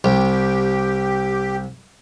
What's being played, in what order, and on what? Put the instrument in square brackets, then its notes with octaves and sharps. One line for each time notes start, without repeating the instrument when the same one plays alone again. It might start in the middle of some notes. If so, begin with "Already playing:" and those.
[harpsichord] C2 [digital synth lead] G4